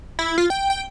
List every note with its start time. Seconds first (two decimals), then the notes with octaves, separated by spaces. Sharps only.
0.19 E4
0.38 F4
0.50 G5
0.70 G5